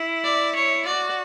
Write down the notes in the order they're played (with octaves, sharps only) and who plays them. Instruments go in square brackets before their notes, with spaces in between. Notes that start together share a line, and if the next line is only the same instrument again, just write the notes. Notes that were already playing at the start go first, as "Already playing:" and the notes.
Already playing: [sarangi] E4
[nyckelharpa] D5
C#5
[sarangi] F#4 [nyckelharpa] D5